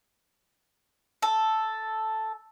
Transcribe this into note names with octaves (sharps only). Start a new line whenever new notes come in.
A4